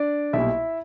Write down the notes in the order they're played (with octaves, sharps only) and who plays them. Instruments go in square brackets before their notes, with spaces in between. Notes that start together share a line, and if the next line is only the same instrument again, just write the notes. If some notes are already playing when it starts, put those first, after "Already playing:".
Already playing: [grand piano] D4 D5
B1 A#2 G3 E4 E5